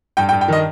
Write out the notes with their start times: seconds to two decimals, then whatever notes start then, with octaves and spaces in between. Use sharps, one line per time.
0.17 G2 G5
0.29 G5
0.33 G2
0.41 G5
0.48 D#3 D#5